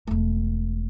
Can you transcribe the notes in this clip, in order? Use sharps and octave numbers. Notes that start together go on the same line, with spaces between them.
E1 A3